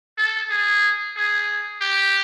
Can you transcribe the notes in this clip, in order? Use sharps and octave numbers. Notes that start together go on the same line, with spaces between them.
A4
G#4
G#4
G4